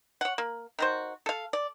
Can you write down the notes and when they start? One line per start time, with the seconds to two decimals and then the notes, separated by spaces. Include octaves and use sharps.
0.21 C#5 F#5
0.38 A#3
0.79 D#3 F#4 C5
1.26 A4 F5
1.53 D5